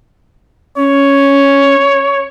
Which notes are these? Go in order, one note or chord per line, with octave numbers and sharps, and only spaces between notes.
C#4 C#5